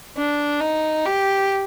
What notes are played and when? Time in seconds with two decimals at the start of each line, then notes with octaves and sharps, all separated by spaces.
0.17 D4
0.60 D#4
1.05 G4